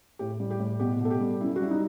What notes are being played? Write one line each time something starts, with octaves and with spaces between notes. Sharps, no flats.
A2 G4
G3
G4
A2
B2 G4
B2 A4
G4
G3
F#2 E4
F#4
G3 E4
D#4